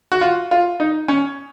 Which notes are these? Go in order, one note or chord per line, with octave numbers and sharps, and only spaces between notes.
F#4
F4
F4
D#4
C#4